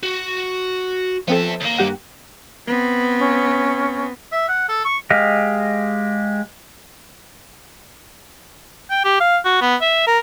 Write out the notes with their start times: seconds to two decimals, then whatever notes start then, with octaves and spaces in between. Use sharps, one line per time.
0.03 F#4
1.28 F3 B3 C4 A4 E5
1.61 D#2 A#3
1.79 G2 G4 F#5
2.67 B3 C4
3.19 C#4
4.32 E5
4.48 F#5
4.69 A4
4.85 C#6
5.10 G#3 G4 D#5 F5
8.90 G5
9.04 G4
9.20 F5
9.45 F#4
9.62 B3
9.81 E5
10.07 A#4